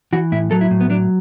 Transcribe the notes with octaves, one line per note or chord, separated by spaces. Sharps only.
E3 F#4
A2 E4
F#3 A4
E4
A2
B3
F#3 D4